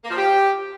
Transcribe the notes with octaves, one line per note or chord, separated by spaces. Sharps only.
A#3
F3
G4